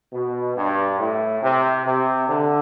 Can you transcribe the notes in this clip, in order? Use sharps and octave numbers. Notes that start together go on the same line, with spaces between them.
B2
G2
A2
C3
C3
D3